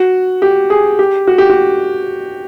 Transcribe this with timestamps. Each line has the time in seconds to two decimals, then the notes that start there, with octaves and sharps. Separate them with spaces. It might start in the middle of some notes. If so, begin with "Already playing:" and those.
Already playing: F#4
0.42 G4
0.70 G#4
0.99 G4
1.27 F#4
1.38 G4
1.50 F#4